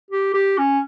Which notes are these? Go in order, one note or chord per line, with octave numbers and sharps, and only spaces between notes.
G4
G4
C#4